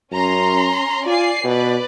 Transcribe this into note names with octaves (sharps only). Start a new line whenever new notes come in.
F#2 C#4 A#5 C6
F4 D5 G#5 C7
B2 B4 D5